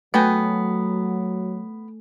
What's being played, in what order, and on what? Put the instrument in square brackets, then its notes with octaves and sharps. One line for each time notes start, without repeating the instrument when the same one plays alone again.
[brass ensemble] F#3 [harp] A3 G#5 [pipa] B3 F#4 G5